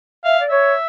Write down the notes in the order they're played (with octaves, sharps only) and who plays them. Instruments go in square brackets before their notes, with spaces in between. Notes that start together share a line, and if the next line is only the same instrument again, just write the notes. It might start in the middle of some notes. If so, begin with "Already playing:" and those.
[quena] E5 [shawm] F5
[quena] D5
[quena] C#5 [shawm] E5